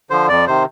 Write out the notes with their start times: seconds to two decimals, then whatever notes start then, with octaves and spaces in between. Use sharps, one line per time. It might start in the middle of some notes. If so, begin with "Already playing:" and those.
0.10 D3 F3 C5
0.28 F2 D5
0.47 C3 D#3 C5